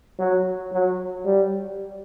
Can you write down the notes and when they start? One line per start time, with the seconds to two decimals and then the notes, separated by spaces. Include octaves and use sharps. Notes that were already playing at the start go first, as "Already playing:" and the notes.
0.19 F#3
0.73 F#3
1.25 G3